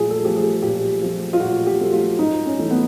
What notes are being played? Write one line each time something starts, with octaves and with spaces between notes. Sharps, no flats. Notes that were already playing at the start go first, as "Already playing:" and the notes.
Already playing: A#2 F3 A3 G#4
A4
F3 A3 G4
G#4
A#2 G4
F3 A3
F4
A#2 F#4
G4
F3 A3
F4
G#2 D#4
C#4
E3 A3
B3